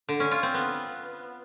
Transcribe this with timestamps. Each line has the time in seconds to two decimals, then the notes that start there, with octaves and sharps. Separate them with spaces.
0.09 D3
0.20 C#4
0.31 F4
0.43 C4
0.54 B3